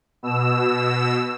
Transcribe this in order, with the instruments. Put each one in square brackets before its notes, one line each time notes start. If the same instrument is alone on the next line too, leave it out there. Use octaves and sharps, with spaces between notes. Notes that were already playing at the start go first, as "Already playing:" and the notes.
[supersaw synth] B2 E6